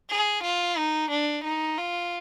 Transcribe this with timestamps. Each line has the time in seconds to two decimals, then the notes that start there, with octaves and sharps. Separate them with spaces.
0.10 G#4
0.43 F4
0.77 D#4
1.11 D4
1.44 D#4
1.78 F4